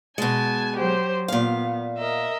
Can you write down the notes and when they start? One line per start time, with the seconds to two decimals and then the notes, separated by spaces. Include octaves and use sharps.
0.18 B2 G#3 G#5 A5
0.76 F#3 G4 C5
1.28 A#2 B3 F5
1.98 A#4 D#5 E5